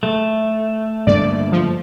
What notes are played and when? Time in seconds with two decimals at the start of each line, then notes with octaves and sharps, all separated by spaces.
0.03 A3
1.07 G2 D3 A#3 D5
1.52 F3